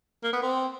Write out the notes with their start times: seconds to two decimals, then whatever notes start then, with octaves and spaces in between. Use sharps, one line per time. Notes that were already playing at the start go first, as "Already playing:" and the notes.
0.23 A#3
0.33 B3
0.43 C4